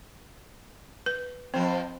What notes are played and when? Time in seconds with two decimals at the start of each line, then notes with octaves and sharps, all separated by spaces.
1.06 B4
1.54 F2 F3 C4 C5